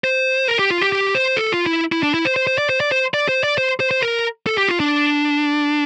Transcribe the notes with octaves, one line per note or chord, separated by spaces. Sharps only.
C5
A#4
G4
F4
G4
G4
C5
A4
F4
E4
E4
D4
E4
C5
C5
C5
D5
C5
D5
C5
D5
C5
D5
C5
C5
C5
A#4
A4
G4
F4
D4